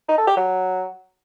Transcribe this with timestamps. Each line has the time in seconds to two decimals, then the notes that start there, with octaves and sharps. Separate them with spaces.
0.09 D#4
0.18 A4
0.27 G4
0.37 F#3